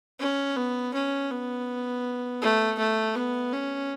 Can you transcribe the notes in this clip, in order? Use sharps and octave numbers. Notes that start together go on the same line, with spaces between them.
C#4
B3
C#4
B3
A3
A3
B3
C#4